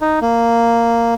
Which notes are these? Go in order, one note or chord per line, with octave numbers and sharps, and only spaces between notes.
D#4
A#3